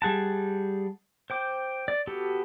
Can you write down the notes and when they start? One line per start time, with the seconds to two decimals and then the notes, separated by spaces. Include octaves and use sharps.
0.02 G3 G#4 F#5 A5
1.30 C5 G5 D6
1.88 D5
2.07 B3 F#4 G4 A4